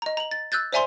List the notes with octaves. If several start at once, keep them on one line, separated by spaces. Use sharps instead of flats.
D#5 A#5
A#5 F#7
A6
E6 F#6 G6 A6
C5 D5 E5 G#5 A#5 C6